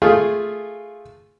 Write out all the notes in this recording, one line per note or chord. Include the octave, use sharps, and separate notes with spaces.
A3 F4 G#4